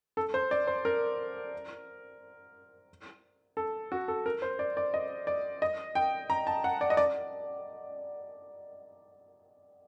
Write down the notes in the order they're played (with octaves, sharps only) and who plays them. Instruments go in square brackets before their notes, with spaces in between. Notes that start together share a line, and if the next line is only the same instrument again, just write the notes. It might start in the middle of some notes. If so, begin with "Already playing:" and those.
[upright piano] A4
C5
D5
C5
A#4
A4
F#4
A4
A#4
C5
D5
D5
D#5
D5
D#5
G5
A#5
A5
F#5
D5
D#5
D5